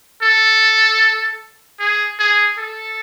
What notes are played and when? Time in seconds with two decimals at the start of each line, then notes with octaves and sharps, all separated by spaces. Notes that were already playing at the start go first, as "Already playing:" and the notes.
0.22 A4
1.79 G#4
2.19 G#4
2.58 A4